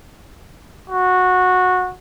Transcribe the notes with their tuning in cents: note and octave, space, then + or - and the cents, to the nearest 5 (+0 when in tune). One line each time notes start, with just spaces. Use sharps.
F#4 -15